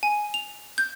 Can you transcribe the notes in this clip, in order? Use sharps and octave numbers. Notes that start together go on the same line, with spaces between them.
G#5
F7
G6